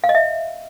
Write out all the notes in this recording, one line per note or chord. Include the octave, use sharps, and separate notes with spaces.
F5
D#5
E5